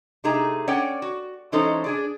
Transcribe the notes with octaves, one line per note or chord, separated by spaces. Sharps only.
C3 A3 D#4 G#4 A#5
C#4 C#5 D5 F#5 G5
F#4
E3 G#3 C#4 D#4 A4 C5
D4 G#4 D5